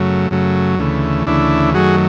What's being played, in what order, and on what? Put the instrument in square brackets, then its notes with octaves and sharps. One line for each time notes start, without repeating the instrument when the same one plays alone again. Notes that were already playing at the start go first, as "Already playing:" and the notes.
Already playing: [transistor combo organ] F#2 C#3 F#3 A3
F#2 C#3 F#3 A3
D2 C#3 E3 A3
D2 C#3 E3 A3 D4 E4
F#2 D#3 F#3 A3 F#4 G#4